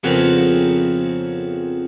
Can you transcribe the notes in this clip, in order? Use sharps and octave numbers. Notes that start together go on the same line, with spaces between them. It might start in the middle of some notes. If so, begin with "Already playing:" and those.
F2 C#3 B3 C4 A#4 F#5